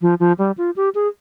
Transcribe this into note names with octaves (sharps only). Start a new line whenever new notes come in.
F3
F3
G3
F4
G4
G#4